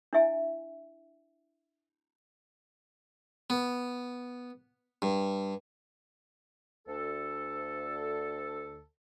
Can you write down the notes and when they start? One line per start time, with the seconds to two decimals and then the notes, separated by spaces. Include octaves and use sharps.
0.13 D4 E4 E5 G#5
3.50 B3
5.02 G2
6.87 D2 A4